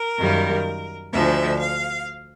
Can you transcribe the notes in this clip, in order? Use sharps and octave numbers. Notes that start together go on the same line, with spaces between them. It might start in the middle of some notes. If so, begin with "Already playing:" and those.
Already playing: A#4
F#2 D#3 G3 A#3
D2 D3 F3 G#3 E5
F5